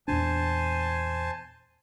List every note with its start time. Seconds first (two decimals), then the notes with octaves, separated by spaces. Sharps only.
0.08 E2 A#2 D4 C5 G#5 A5